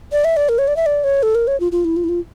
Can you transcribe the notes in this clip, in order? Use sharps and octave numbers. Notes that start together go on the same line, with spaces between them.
D5
E5
D5
A#4
C#5
D5
E5
D5
C#5
A4
A#4
C#5
F4
F4
E4
F4
E4
F4